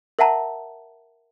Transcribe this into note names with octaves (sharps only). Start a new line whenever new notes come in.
A#4 E5 F#5 A5 A#5